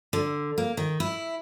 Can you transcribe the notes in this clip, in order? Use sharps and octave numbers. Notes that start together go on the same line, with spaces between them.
D3
A#3
D#3
E4